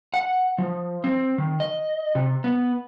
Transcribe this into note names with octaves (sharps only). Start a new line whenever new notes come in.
F#5
F3
C4
D#3
D#5
C3
B3